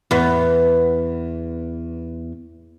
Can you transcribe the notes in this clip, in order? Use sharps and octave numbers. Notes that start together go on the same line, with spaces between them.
E2 B3